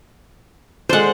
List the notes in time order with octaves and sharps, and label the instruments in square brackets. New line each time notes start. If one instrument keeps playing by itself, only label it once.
[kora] G#3 A4 D5 [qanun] C5 F#5